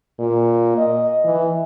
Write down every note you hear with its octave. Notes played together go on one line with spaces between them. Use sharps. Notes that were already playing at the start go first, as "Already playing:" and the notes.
A#2
D#5
E3